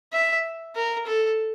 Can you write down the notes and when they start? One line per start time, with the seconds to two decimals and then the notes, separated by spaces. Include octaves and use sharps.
0.13 E5
0.75 A#4
1.06 A4